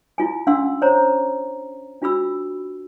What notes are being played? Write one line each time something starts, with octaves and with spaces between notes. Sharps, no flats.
E4 F4 G#5
C#4 D4 F5 F#5 C6 E6
C5 C#5 A#5
D4 F4 F#4 B5 E6